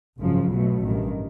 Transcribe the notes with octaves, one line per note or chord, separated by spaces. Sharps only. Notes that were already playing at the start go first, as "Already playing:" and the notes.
G#1 F#2 C#3 F3
B1 B2 F#3 A3
A1 G2 D#3